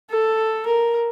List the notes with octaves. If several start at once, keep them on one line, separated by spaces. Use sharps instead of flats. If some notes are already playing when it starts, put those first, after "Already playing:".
A4
A#4